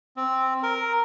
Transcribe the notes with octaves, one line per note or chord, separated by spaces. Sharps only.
C4
A#4